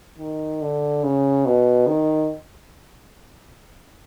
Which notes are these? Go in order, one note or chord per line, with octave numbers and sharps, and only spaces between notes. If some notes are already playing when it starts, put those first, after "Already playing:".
D#3
D3
C#3
B2
D#3